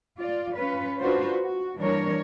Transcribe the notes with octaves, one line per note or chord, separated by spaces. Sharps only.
F4 D5
C#4 F4 B4
D4 F4 F#4 B4 C5
F#4
E3 G3 A#3 D4 A#4 C#5